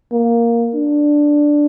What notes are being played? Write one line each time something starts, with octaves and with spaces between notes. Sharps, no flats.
A#3
D4